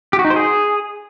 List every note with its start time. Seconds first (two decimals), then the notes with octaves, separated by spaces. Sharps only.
0.13 G4
0.19 F#4
0.25 D#4
0.30 C5
0.36 G#4